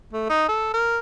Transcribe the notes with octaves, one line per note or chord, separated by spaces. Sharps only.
A3
D#4
A4
A#4